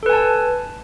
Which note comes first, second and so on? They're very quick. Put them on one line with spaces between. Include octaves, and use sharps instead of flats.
A4 B4 G#5 A5